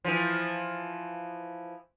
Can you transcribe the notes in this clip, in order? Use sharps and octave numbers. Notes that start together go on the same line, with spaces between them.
E3 F3